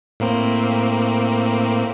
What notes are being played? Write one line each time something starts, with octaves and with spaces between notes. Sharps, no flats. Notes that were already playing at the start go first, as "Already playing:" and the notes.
A2 A#3 C4